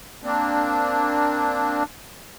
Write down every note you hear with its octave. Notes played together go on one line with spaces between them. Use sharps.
A#3 C4 D4